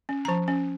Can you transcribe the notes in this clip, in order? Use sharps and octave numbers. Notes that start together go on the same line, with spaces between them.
C#4
A#5
F3 A5
C#4